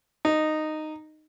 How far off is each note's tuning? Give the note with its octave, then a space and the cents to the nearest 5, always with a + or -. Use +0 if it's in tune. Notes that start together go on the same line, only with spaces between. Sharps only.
D#4 -10